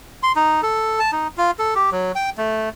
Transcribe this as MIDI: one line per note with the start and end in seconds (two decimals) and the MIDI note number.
0.23 0.32 84
0.36 0.61 63
0.63 0.99 69
0.99 1.11 81
1.12 1.28 63
1.37 1.51 65
1.59 1.74 69
1.75 1.90 67
1.92 2.12 54
2.15 2.30 79
2.38 2.69 57